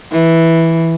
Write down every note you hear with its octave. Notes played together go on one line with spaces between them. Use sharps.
E3